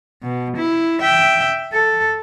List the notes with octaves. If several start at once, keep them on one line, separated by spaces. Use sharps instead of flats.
B2
E4
E5 G5
A4